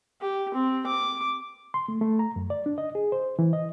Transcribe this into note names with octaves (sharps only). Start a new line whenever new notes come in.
G4
C4
D6
C6
A3
A3
A#5
F#2
D5
D4
D#5
G#4
C5
E3
D#5